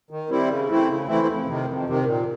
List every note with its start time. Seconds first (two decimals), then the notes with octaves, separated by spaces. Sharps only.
0.11 D#3
0.30 G3 C4 E4
0.48 C#3
0.68 E3 A3 C4 E4
0.88 C#3
1.08 E3 A3 C4 E4
1.27 F2
1.46 C3 D#3
1.66 F2
1.85 C3 D#3
2.05 A#2